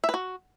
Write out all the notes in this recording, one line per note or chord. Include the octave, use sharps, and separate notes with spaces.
E5
B4
F#4